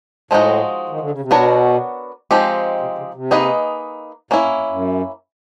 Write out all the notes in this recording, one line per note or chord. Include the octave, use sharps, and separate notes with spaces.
A2 F3 G#3 C4 D#4 F#4
D#3
D3
C#3
C3
B2 B3 D4 F#4 A#4 C#5
F3 G#3 C4 D#4 G4
C3
C#3
C3
A#3 D#4 G#4 B4 D#5
A2 A#3 C#4 E4
G2
F2
F#2